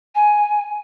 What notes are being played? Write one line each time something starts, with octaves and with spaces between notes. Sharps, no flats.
G#5